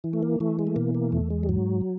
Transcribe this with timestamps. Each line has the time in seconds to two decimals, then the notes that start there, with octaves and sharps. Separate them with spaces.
0.04 E3
0.13 A3
0.23 A#3
0.40 E3 A3
0.59 G#3
0.67 A3
0.76 B2 A#3
0.95 A#3
1.12 E2 A3
1.30 G#3
1.43 G3
1.49 G#2 F#3